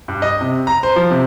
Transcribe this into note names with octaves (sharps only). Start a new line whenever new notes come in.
G2
D#5
C3
A#5
C5
F3
C3